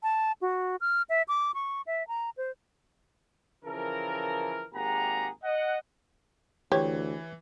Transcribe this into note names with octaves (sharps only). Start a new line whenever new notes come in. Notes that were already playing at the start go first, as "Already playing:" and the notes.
A5
F#4
F6
E5
D6
C#6
E5
A#5
C5
C#3 E3 F3 A4 A#4
G#1 A#3 G4 G#4 F#5 A#5
D#5 F#5
D2 E3 G4 C#5